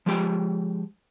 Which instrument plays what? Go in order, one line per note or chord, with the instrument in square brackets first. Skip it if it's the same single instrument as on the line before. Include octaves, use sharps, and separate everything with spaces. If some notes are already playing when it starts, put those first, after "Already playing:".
[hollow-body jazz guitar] F3 G#3 G4 G5